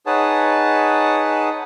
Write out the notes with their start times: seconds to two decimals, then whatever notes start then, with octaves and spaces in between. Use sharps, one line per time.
0.06 D#4 G#4 B4 C#5 F#5 A5